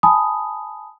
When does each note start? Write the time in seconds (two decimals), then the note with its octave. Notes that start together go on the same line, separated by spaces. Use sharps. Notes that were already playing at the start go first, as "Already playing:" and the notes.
0.03 G#5 A5 B5 D#6